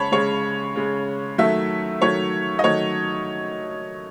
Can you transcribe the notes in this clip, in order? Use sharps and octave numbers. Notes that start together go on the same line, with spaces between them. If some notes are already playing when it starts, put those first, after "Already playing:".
Already playing: C#3 G#3 C#5 A5 B5
C#3 G#3 C#5
C#3 G#3
D#3 F#3 A3 E5
D#3 F#3 A3 C#5
D#5
D#3 F#3 A3 C#5